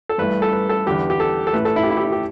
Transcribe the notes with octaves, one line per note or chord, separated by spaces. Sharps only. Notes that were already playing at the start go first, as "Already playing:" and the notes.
A4
G2 E3 A3 B4
A4
B4
A4
E2 D3 B3 G4
G4
A4
A4
A2 A3 B4
A4
E4
G4
E4
G4
E4
G4